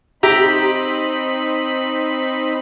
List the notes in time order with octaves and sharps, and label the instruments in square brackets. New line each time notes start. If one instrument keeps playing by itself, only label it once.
[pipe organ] C4 D#4 B5 [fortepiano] G4 E5 A#5